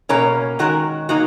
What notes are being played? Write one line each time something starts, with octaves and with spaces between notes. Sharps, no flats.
B2 A#3 C#4 A#4 C#5
D#3 G#3 C#4 F#4 A#4
D#3 F#3 A#3 D#4 F#4